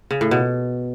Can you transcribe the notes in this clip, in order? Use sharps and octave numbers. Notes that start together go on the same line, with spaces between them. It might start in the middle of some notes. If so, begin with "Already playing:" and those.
C#3
A2
B2